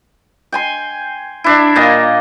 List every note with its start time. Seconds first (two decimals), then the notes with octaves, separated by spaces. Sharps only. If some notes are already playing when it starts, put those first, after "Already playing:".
0.52 G5 G#5 C6
1.44 D4 E4
1.76 A#2 A#3 D#5